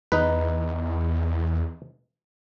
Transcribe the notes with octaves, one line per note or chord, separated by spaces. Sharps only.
E2 D#4 B4